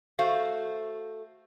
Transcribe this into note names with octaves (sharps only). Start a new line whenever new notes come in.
A3 F#4 C5 F5